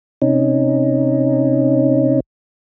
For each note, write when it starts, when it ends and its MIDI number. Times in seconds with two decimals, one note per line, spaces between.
0.22 2.20 48
0.22 2.20 61
0.22 2.20 63